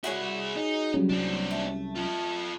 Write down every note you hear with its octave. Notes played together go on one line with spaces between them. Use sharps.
C2 E4 F#4 G#4 C#5
D#4
C#3 F#3 G3 C#4
C2 C4 D4
A3
F4 A4